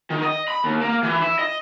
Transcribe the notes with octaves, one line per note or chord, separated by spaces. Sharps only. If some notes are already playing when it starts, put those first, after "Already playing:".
D#3
D#5
B5
D#2
A#3
E3
E4
D#5